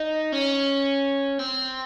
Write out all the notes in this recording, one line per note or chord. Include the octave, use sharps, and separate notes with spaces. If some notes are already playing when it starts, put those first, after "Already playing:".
Already playing: D#4
C#4
C4